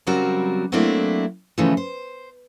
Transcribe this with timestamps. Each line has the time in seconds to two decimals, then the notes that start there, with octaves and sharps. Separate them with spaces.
0.07 C#3 F#3 G3 C4 F#4 A#4
0.72 F#3 A3 A#3 C4 D4 E4
1.58 C#3 E3 F3 G#3 A3
1.77 C5